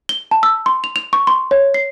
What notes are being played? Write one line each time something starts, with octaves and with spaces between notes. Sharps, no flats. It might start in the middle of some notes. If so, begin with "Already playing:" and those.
G7
A5
E6
C6
F7
F7
C#6
C6
C#5
C7